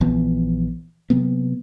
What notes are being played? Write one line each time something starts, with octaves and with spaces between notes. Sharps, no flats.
A#1 E3 F3 B3
C3 F#3 A#3 B3